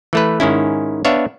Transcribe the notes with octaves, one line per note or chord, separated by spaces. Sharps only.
E3 A3 B4
G#2 D#3 C#4 E4
B3 D4 C#5 E5 F5